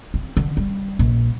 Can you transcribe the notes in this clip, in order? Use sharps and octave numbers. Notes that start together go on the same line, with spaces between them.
C4
D3
G3
A#1